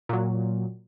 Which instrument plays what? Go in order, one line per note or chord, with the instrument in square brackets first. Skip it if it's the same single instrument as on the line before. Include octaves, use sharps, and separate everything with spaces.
[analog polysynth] A#2 F#3